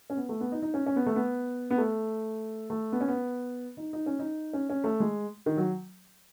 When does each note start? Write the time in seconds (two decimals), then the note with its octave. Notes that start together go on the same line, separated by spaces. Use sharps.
0.10 C#4
0.17 B3
0.29 A3
0.40 B3
0.52 D#4
0.62 D#4
0.74 C#4
0.86 C#4
0.96 B3
1.06 A3
1.16 B3
1.70 B3
1.78 A3
2.70 A3
2.92 B3
3.01 C#4
3.08 B3
3.77 D#4
3.93 D#4
4.06 C#4
4.19 D#4
4.53 C#4
4.70 C#4
4.84 A3
5.00 G#3
5.46 D#3
5.57 F#3